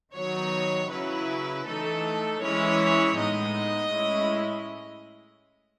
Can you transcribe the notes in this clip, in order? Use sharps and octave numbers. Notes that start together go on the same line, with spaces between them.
D#3 F#3 B3 D#4 C#5
C#3 F#3 C#4 E4 B4
E3 A3 D#4 A4
E3 G#3 C#4 E4 C#5
A2 G#3 B3 D#4 D#5
A2 G#3 C#4 E4